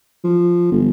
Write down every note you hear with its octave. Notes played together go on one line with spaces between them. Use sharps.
F3
G1